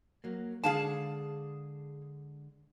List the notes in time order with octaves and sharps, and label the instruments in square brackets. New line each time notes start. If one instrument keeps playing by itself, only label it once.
[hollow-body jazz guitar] F#3 A#3
[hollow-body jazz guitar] D3 G#3 D4 [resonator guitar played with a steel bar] G#4 F5 A5